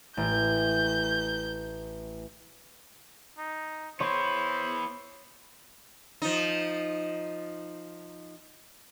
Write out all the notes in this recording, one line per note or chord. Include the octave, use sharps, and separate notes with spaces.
A1 G6
D#4
B3 E4 C5 C#5 C6
F3 D#4